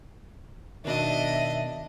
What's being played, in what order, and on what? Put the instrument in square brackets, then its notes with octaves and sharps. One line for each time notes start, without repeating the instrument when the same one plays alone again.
[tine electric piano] B2 D#3 [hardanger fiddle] D4 D#5 [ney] E5